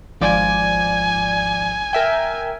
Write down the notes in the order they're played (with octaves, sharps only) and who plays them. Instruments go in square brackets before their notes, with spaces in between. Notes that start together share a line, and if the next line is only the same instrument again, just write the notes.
[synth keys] G#1 F3 D5 [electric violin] G#5
[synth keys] A#4 E5 G5